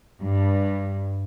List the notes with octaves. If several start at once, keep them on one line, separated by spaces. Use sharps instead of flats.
G2